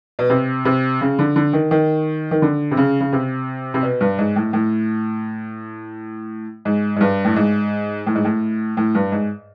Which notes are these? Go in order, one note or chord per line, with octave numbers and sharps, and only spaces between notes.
B2
C3
C3
C#3
D3
D3
D#3
D#3
D#3
D3
C3
C#3
C#3
C3
C3
B2
G2
G#2
A2
A2
G#2
G#2
G2
A2
G#2
A2
G#2
A2
A2
G2
G#2